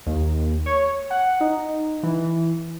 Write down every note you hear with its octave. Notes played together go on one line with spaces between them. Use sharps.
D#2
C#5
F#5
D#4
E3